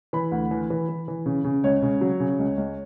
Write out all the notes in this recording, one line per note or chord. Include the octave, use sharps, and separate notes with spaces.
E3 B5
D2
E3
E3
E3
E3
C#3
C#3
C#2 C#5
C#3
F#3
C#3
C#2
C#2